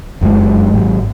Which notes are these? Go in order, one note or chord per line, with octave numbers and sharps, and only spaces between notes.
F1 F#2 F#3 G#3
G#1 G#2 F#3